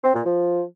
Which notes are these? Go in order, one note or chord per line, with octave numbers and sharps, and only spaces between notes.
C4
A#2
F3